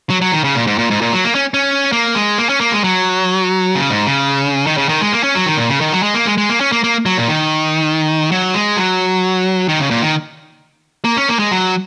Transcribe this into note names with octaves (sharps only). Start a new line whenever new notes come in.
F#3
F#3
D#3
C#3
A#2
G#2
A#2
G#2
A#2
F#3
A#3
C#4
C#4
A#3
G#3
A#3
C#4
A#3
G#3
F#3
C#3
G#2
C#3
D#3
C#3
D#3
G#3
A#3
C#4
F#3
D#3
A#2
C#3
D#3
F#3
G#3
A#3
G#3
G#3
A#3
C#4
A#3
A#3
F#3
A#2
D#3
F#3
G#3
F#3
D#3
C#3
A#2
D#3
A#3
C#4
A#3
G#3
F#3